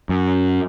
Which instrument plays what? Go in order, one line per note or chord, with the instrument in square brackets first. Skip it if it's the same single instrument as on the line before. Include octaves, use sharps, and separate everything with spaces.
[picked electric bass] F#2